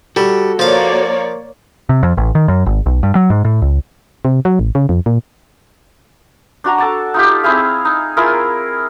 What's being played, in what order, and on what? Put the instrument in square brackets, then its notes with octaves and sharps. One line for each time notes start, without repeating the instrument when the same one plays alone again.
[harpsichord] G3 [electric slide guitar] F#4 A4
[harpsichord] F3 F5 [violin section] A#3 C#5 D5
[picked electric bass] C3
F2
A1
D#3
F#2
G#1
B1
G2
F#3
G#2
A2
C#2
[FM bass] C3
F#3
A1
C#3
F2
A#2
[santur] D4 F#4 A#5
A4 A5 D6
D#4 F4 G4
C4 E4 G#4 F5
D#4
E4 F4 G#4 A#4